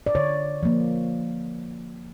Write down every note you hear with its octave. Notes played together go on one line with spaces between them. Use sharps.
D5
D3 C#5
F3 A#3